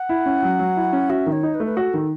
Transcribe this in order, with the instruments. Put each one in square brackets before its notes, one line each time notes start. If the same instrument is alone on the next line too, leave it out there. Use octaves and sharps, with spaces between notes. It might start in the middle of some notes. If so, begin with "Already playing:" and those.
Already playing: [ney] F#5
[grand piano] E4
C#4
F#3
F#3
E4
C#4
[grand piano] F#4 [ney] E5
[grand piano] D#3
[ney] C#5
[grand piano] D#4
[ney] B4
[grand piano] A3
[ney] B4
[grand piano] F#4 [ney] A4
[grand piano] D#3